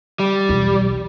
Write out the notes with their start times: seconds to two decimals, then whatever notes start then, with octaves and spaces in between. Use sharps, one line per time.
0.19 G3
0.49 B1 E2